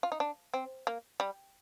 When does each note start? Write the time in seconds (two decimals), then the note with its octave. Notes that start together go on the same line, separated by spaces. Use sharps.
0.03 F4
0.12 D#4
0.20 D4
0.54 C4
0.87 A#3
1.20 G3